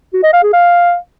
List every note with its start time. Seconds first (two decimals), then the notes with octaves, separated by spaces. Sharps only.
0.13 F#4
0.23 D#5
0.33 F5
0.43 G#4
0.53 F5